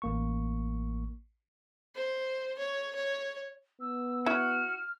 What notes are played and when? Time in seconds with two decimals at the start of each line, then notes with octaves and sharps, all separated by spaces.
0.02 A1 A#3 C#6
1.95 C5
2.58 C#5
2.95 C#5
3.81 B3 E6
4.26 E4 F#4 E5 F6